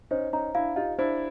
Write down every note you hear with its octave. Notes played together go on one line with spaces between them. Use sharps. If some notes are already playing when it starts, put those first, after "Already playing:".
C#4 D#4 C5
C#4 D#4 A#5
D4 E4 F5
D#4 F4 G4
D4 E4 C5